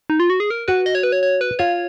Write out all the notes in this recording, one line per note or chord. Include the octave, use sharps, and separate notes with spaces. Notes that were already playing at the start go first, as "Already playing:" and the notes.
D#4
F4
F#4
G#4
A#4
F#4 B4
D#5
C#5
B4
C#5
C#5
B4
F4 C#5